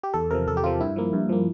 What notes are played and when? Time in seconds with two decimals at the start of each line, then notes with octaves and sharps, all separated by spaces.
0.03 G4
0.14 E2 A4
0.31 C3 F3 A#4
0.48 E2 A4
0.57 G4
0.64 C3 F3 F4
0.80 G2 E4
0.96 F3 A#3
1.13 G2
1.29 F3 A#3